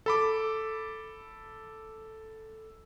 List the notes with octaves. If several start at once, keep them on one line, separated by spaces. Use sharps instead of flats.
A4 B5 D6